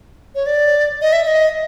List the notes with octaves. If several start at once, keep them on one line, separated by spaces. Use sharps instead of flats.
C#5
D5
D#5
E5
E5
D#5